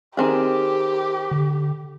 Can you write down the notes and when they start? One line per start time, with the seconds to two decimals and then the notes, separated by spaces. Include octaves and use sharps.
0.17 D#3 C4 G4 G#4
1.31 D3